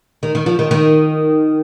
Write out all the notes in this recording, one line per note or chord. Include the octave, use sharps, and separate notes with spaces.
D#3
D#3
F3
D#3
D#3